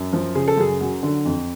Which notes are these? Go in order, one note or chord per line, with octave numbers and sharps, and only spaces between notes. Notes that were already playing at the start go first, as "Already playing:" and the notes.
Already playing: F#2
F3
C#3 G#4
A4
F#2 G#4
F#3
D3
F2